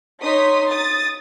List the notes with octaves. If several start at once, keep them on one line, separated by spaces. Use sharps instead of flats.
D#4 C#5 C6 D#6 B6
D#6 A6